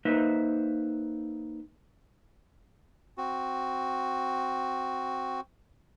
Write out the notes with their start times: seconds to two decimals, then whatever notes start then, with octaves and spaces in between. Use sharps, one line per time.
0.05 A#3 D#4 B4 C5 E5
3.18 C4 F#4